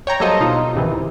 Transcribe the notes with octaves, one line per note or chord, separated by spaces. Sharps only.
C#5 G5 A#5
F#3 G3 A#3 A4 C5 D#5
B2 D#4 F4
C#2 G#2 C3 D#3 E3